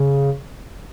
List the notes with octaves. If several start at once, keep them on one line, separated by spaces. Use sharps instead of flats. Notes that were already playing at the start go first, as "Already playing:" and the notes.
Already playing: C#3